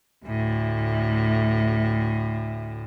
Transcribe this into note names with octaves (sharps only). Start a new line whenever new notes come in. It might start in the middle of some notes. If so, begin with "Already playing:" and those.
D2 A2